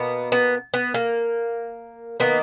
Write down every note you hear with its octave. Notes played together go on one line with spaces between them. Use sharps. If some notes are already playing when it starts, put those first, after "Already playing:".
Already playing: B2 A#3 B3
B3
B3
A#3
D#3 A#3 B3